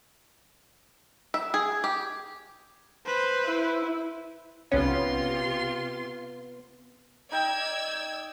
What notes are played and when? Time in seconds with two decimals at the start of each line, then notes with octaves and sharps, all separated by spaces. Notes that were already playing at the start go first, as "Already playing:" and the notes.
1.34 E5
1.54 G#4
1.84 G4
3.06 B4 C5
3.46 E4
4.72 B1 C3 B3 C#4 F4 C6
7.32 D#4 D5 G5 E6 G#6